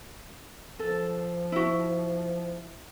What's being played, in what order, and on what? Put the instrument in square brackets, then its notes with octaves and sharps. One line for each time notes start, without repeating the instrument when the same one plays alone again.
[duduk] F3 [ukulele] A4
[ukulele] E4 F#4